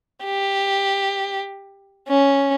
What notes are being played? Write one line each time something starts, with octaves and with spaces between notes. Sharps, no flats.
G4
C#4